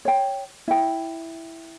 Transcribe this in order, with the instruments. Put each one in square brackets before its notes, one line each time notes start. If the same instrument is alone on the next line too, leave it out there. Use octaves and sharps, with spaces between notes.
[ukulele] C#5 G5
E4 G5